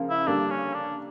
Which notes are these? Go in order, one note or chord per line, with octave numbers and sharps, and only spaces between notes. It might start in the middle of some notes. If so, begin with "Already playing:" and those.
Already playing: C#3 F3 A#3
E4
D3 G3 A#3 D4
C#4
D4